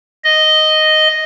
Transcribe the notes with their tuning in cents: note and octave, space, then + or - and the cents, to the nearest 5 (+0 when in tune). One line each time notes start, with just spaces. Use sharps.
D#5 -5